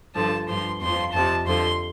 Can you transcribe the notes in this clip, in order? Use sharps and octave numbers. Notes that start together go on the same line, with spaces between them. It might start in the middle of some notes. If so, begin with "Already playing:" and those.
G2 D3 F3 A5
G2 F3 C6
F2 F3 C6
F2 C3 F3 A5
F2 D3 F3 C6